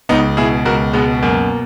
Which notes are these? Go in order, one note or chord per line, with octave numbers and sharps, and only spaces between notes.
C#2 B3 D#4
B2 E4 G#4
C#2 F#4 A#4
B2 G#3 B3
F#2 A#3